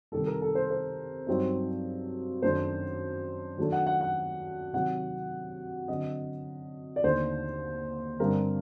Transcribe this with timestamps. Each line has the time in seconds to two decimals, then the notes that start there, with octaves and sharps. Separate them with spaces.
0.12 C3 D#3 G3 A4
0.27 A#4
0.41 A4
0.55 C5
0.70 C5
1.27 G2 F#3 C4 D#4
2.42 F#2 D#3 A3 D4 C5
3.58 D#3 F#3 A3 D4 A4
3.72 F#5
3.87 F#5
4.01 F#5
4.73 C3 D#3 F#3 F#5
5.88 D3 F#3 C4 F#4 D#5
6.96 D5
7.04 D#2 D3 A3 D#4 C5
8.19 G2 D3 G3 C4 A#4